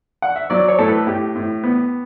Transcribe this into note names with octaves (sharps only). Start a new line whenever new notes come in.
F#5
E5
F#3 D5
C#5
A2 A4
B4
A2 G4
A2
B3